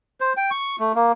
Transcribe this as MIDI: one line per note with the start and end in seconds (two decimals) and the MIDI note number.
0.21 0.33 72
0.37 0.50 79
0.51 0.76 85
0.79 0.92 57
0.95 1.12 58